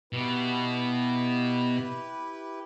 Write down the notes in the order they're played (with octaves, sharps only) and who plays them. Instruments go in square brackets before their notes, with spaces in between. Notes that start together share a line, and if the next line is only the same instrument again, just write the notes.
[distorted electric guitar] B2 [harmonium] E4 G4 B4